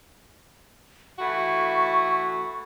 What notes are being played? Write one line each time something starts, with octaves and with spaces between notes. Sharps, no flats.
E3 A3 F#4 C#6